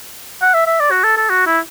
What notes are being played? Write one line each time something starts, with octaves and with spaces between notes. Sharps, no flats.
F#5
E5
E5
D5
F#4
A4
A4
F#4
E4